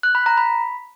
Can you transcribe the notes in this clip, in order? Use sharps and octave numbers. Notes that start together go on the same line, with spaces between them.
F#6
B5
A#5
B5